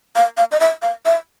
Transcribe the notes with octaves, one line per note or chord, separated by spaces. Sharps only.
F5
F5
D#5
E5
F5
E5